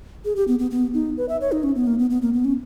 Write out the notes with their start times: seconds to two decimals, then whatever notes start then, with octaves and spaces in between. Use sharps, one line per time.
0.25 G#4
0.36 G4
0.48 B3
0.59 B3
0.71 B3
0.94 D#4
1.17 B4
1.29 E5
1.41 C#5
1.52 D#4
1.63 C#4
1.75 B3
1.87 A#3
1.99 B3
2.10 B3
2.22 A#3
2.34 B3
2.45 C#4